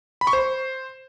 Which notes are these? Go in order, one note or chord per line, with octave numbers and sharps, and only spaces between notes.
B5
C#6
C5